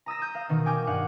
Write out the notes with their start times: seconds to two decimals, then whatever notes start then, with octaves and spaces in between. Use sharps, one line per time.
0.06 A#5 D#6 E6 A#6
0.19 D#6 G6
0.34 F5
0.49 B2 D#3
0.66 G5 G#5 D6 F6
0.87 G2 F5 F#5